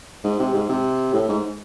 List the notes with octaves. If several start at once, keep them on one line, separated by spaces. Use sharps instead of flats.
G#2
C3
G#2
C3
A2
G#2